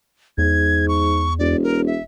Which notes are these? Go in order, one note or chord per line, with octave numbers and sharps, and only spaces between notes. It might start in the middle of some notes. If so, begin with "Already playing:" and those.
E2 G#2 G#6
C#6
E1 D5
A#4
E5